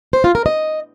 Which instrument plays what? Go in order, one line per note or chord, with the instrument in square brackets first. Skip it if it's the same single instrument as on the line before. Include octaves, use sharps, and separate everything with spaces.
[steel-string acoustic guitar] C5
F4
A#4
D#5